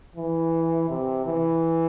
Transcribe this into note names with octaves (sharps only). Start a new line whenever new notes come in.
E3
C3
E3